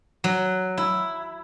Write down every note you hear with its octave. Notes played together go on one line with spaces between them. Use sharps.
F#3
E4